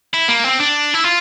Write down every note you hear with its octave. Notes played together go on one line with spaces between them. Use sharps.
E4
A#3
C4
D4
E4
F4